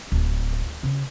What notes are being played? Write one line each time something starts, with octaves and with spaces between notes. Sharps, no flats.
D1
C#3